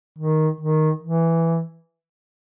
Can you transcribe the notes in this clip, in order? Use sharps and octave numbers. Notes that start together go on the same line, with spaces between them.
D#3
D#3
E3